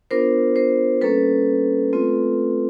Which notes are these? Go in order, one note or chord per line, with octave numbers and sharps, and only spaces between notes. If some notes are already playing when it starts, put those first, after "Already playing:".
B3 D4 F4 A#4 C5
A#4 C5
G3 A#3 C#4 A4 B4
A3 C4 F4